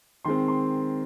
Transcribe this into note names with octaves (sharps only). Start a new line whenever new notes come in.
D#3 G#3 C4 C6
C6